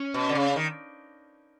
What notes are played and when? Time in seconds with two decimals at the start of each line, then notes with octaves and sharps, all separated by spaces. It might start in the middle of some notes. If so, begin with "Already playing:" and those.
Already playing: C#4
0.14 B2
0.29 D3
0.35 C#3
0.56 D#3